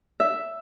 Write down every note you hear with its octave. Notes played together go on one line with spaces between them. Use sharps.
E5